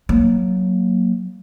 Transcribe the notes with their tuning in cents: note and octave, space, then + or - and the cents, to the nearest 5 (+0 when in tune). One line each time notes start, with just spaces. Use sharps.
F#3 +0 A#3 +0